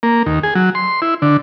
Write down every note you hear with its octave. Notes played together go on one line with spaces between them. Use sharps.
A#3
D#2
G#4
F#3
C6
E4
D3